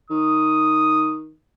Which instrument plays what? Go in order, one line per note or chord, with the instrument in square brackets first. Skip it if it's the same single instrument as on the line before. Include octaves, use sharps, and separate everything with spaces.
[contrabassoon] D#3 [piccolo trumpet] D#6